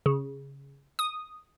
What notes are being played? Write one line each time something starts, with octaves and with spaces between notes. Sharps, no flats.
C#3
D#6